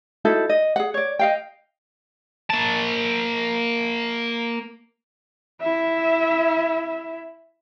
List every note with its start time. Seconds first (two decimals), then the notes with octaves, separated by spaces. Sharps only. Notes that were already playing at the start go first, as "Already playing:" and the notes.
0.25 D#4 E4 F#4 A4
0.49 D#5
0.76 G#4 F#5
0.94 C#5 D5
1.19 D#5 F5 G5
2.50 A#3 A5
5.62 E4 E5